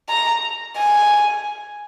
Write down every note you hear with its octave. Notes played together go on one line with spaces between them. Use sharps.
A#5
G#5